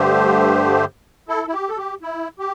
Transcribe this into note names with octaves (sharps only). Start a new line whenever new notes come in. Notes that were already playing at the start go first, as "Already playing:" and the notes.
Already playing: G2 D3 A3 G4 C5
E4 A4
E4
G4
A4
G4
E4
G4